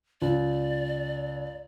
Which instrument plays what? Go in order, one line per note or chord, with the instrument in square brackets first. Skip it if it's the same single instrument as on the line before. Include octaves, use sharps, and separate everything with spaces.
[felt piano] C#2 [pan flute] D5